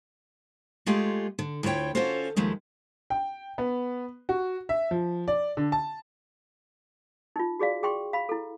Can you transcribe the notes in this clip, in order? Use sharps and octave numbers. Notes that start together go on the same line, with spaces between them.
G#3 A3 F4 G4 G#4
D3
D2 E4 F4 C#5 G5
C#4 D4 F4 F#4 A4 C5
D#2 F3 G#3 A3
G5
B3
F#4
E5
F3
D5
D3
A5
D#4 F4
F#4 G#4 D5 F5
G#4 G5 C6 C#6
F5 B5
E4 A4